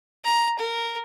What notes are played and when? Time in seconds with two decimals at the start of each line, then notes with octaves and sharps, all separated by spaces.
0.25 A#5
0.59 A#4